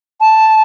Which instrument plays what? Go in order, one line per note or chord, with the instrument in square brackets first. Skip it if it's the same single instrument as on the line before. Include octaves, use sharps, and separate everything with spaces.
[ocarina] A5